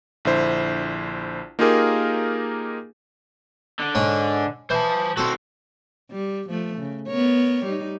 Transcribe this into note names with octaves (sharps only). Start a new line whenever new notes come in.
A#1 D3 E4 C5
A#3 D#4 F4 G4 G#4 A#4
D3
G#2 C#4
E3 C5 A5
C4 F#4 A4 C5
G3
F3 A3
C#3
B3 A#4 C#5
G3 D#4